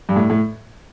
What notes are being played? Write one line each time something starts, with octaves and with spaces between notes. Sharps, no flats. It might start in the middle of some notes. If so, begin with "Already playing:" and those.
G2
A2
A2